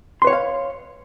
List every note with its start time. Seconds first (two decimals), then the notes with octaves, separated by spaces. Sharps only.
0.22 C6
0.24 B4
0.27 C#5
0.30 F#5
0.32 F5